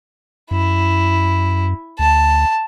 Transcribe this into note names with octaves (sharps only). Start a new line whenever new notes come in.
F#2 E4
D2 A5